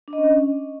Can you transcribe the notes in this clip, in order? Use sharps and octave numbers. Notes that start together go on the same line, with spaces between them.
D4
D#5
C#4